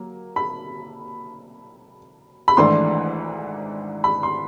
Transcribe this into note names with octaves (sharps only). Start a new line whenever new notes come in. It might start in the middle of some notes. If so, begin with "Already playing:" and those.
Already playing: F#3 A#3
B5
B5
G#1 G#2 E3 A3 D4 C6
B5
C6